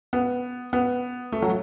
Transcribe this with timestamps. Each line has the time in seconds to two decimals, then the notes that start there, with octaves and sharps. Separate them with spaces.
0.13 B3
0.73 B3
1.32 A3
1.42 F#3